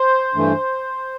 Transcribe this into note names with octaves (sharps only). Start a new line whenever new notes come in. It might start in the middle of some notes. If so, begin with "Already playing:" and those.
Already playing: C5
G2 E3 A3